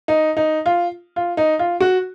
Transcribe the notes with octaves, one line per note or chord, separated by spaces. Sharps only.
D#4
D#4
F4
F4
D#4
F4
F#4